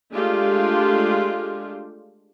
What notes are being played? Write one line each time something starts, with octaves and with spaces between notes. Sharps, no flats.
G#3 A3 D4 F4 G4